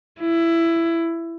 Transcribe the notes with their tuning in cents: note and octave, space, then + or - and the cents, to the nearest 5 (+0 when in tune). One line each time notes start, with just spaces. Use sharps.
E4 +15